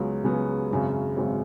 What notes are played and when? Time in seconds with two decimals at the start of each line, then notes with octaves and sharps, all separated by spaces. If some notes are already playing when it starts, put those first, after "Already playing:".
Already playing: C#2 C#3 F#3 B3
0.24 C#2 C#3 F#3 B3
0.70 G#1 F#2 C#3
1.17 G#1 F#2 C#3